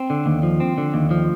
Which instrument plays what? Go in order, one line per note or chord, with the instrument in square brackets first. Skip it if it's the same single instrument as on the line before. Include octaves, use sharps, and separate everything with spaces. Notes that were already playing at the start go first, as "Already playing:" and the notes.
Already playing: [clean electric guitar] C4
D3
D#2
F3
C4
D3
D#2
F3